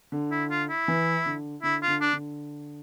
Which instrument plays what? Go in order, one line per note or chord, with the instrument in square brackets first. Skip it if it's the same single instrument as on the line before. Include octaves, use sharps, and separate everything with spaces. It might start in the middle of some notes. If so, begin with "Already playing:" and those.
[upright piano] D3
[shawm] E4
F4
E4
[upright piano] E3
D3
[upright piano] D3 [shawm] E4
[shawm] F4
[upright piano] D3
[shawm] D4
[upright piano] D3